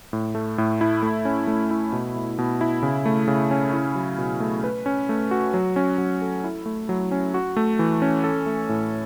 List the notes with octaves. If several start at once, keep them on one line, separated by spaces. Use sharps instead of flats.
A2
A3
A2
E4
A3
C#4
A3
E4
B2
A3
B2
E4
C#3
A3
C#3
C#4
E4
F#3
B2
A3
B4
C#4
A3
F#4
F#3
C#4
F#3
A4
E4
A3
F#3
C#4
F#4
A3
E3
C#4
A4
A3
A2